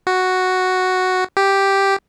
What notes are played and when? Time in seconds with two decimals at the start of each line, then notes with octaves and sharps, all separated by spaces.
0.07 F#4
1.37 G4